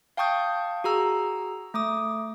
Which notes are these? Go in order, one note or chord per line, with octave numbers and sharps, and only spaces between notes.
F5 G5 A5 C#6 D#6 G6
F#4 G#4 A#5 E6
A3 D6 D#6